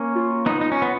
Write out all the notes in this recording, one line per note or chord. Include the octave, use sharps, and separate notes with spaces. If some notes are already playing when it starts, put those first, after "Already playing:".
Already playing: A#3 C#4
F4
B3 D#4
D#4
C#4
B3